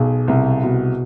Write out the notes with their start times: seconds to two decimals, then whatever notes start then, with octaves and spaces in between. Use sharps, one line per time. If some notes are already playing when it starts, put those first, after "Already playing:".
Already playing: B1 G#4
0.28 C2
0.63 B2